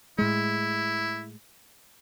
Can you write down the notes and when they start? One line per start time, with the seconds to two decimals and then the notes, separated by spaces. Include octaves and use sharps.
0.18 A2 G#3 E4